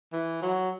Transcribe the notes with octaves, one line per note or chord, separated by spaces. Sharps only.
E3
F#3